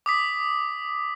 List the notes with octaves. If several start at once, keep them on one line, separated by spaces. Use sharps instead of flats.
D6 D#6 B6